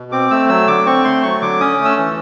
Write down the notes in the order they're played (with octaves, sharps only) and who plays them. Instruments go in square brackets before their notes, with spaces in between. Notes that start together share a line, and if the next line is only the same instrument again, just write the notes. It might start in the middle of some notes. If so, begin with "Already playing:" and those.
Already playing: [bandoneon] B2
C4 D6
A3 E6
F#3 E6
D3 D6
C4 C#6
A3 C6
F#3 C#6
D3 D6
C#4 D#6
A3
E6
E3